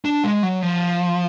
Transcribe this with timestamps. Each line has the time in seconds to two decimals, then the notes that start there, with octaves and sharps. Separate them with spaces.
0.05 D4
0.24 G#3
0.43 F#3
0.62 F3